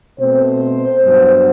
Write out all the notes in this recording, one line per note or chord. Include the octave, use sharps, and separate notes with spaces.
B2 A3 C4 C5
G2 F#3 B3